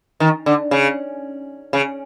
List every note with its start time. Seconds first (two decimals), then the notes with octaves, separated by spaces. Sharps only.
0.20 D#3
0.46 D3
0.71 C#3
1.73 C#3